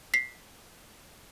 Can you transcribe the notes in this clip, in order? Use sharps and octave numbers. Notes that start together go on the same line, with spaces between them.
B6 C7